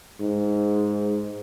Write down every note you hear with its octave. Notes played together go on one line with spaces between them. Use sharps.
G#2